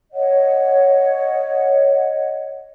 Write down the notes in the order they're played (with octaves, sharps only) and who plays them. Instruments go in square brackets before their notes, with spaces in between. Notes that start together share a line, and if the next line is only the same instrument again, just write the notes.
[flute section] C#5 D#5 F#5